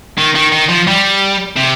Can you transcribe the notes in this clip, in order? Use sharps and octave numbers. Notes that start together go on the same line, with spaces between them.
D#3
D#3
D#3
F3
G3
C3